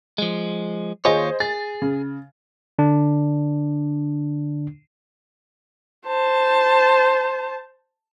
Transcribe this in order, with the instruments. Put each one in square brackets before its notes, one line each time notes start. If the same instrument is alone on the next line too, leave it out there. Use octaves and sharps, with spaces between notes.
[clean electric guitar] F3 G#3
[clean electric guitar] D#2 F4 C#5 [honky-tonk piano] G#4 C5 D#5
[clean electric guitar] G#4 [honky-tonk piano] A6
[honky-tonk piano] C#3
[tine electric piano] D3 D4
[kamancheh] C5 A5